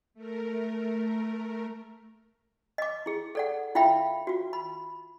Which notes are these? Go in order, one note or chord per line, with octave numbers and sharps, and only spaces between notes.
A3 A#4
D#5 D6
E4 G#4
A4 D5 F#5
E4 F4 E5 F5 G5 B5
F4 F#4
B5